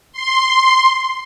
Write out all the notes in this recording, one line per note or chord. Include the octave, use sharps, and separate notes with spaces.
C6